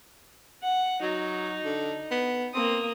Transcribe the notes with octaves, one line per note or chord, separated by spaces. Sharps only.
F#5
F#3 D#4
D3
B3
A#3 C4 D#6